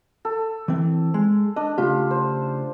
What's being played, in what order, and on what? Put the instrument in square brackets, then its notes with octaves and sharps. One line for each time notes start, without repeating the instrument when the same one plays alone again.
[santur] A4
[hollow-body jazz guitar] E3 C4
G#3
[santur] D4 [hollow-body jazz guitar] D#5
[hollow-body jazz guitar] C#3 A3 G4 [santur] F4
[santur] C5